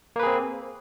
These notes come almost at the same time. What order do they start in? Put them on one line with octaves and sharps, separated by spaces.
A#3 B4 G#4 C4